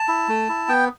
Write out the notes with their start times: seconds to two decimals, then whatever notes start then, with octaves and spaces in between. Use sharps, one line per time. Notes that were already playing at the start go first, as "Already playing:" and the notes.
Already playing: A5
0.08 E4
0.28 A3
0.49 E4
0.68 B3 G5